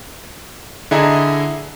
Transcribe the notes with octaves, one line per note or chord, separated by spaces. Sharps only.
D3 E4 G#4 D#5 E5 A#5